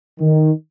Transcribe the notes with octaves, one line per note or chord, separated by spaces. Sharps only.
D#3